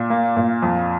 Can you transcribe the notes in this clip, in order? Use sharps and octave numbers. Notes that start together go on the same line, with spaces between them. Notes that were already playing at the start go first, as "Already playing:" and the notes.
Already playing: A#2
A#3
A#2
F2